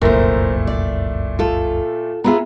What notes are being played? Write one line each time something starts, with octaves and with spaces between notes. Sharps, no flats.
F1 C2 F#2 A#2 A3 E4 A#4 C5
D5
F4 A4
B3 F4 G#4 E5 A#5